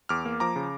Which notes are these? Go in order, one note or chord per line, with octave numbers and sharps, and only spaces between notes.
E2 D6 F6
A#3
F3 A#5 D6
C#3